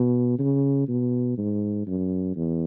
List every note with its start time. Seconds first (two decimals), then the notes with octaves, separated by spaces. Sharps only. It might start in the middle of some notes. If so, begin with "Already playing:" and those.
Already playing: B2
0.39 C#3
0.88 B2
1.38 G#2
1.87 F#2
2.36 E2